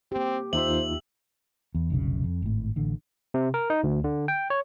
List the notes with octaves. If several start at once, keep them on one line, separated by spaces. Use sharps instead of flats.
A#3 C4 G4
D#2 D#4 F4 C5 E5 F#7
E2
F1 B1 C#3
F2
G#1 A2
A1 D3
C3
A#4
D#4
D2
D3
G5
C#5